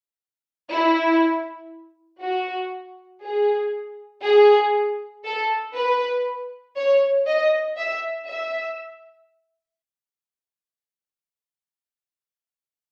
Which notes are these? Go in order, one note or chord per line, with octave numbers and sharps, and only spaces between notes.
E4
F#4
G#4
G#4
A4
B4
C#5
D#5
E5
E5